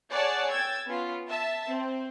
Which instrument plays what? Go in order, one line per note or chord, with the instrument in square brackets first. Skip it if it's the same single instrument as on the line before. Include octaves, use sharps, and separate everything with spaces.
[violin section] G#4 C#5 D5 F#5 G#5 A5
G5 E6 G#6 A6
B3 C#4 F4
E5 A5
C4